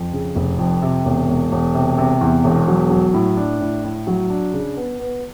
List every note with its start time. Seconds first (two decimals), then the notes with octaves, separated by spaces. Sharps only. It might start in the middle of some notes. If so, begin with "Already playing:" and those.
Already playing: F2
0.13 C#3
0.36 F1
0.59 F2
0.82 C3
1.05 E1
1.28 E1
1.52 E1
1.74 C3
1.98 C3
2.21 E2
2.44 E1
2.68 F#3
2.90 F#3
3.14 A2
3.37 D4
3.60 A2
3.84 A2
4.07 F#3
4.30 D4
4.53 C#3
4.77 B3
5.00 B3